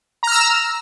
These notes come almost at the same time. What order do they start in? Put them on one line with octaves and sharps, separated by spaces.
A#5 F6 E6